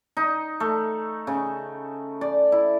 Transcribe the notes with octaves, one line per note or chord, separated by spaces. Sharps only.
D#4
A3
C#3
D5
E4